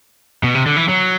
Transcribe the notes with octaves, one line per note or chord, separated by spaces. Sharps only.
B2
C3
D3
E3
F#3